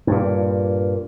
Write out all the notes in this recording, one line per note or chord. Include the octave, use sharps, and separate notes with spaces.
G2 A#2